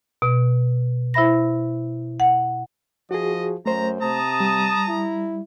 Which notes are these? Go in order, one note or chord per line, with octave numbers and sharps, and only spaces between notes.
B2
E4 C5 E5 B5 A#6
F#5
F3 F#4 G#4 D#5
F#2 A3 C5 A#5
C3 A5 A#5 D#6
G3
E4